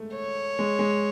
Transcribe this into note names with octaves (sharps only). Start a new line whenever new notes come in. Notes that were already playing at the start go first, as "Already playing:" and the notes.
Already playing: G#3 A3
C#5
G#3
G#3